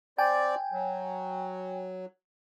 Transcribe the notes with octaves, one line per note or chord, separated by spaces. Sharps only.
C4 D5 G5 G#5
F#3